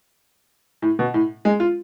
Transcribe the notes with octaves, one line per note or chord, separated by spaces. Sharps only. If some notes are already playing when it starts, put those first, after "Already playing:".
A2
B2
A2
G#3
F4